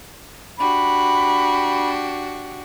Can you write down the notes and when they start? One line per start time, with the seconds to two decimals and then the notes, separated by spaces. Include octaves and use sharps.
0.59 D4 F#4 G4 B5